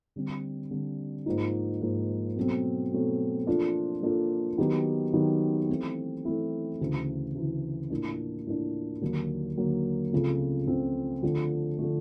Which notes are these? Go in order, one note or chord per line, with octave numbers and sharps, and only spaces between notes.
D3 G3 C4
D3 G3 C4
G#2 F3 A#3 D#4
G#2 F3 A#3 D#4
B2 F#3 A3 C4
B2 F#3 A3 C4
F3 A#3 D4 F4 A4
F3 A#3 D4 F4 A4
D#3 F#3 B3 D#4 G4
D#3 F#3 B3 D#4 G4
E3 A3 C4 E4
E3 A3 C4 E4
D2 C#3 E3
D2 C#3 E3
A2 F3 A#3 D4
A2 F3 A#3 D4
D#2 D3 F#3 A#3
D#2 D3 F#3 A#3
C#2 C#3 F3 A3 C4
C#2 C#3 F3 A3 C4
D3 F3 A3
D3 F3 A3